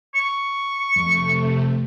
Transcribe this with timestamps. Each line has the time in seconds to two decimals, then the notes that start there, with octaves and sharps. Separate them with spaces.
0.15 C#6
0.96 F2 C3 A3